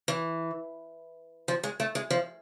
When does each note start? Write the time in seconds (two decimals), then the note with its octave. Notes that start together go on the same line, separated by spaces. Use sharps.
0.08 E3
1.48 F3
1.63 G#3
1.80 A3
1.95 G#3
2.10 F3